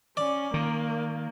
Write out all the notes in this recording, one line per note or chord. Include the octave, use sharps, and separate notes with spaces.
C#4 D5
D#3 A#3